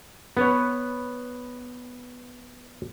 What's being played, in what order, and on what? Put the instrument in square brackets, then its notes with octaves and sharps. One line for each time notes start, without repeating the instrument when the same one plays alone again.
[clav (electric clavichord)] B3 B4 C#5